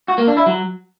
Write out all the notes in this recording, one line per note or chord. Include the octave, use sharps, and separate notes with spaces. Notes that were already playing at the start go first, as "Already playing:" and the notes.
F#4
A#3
D4
E4
F#3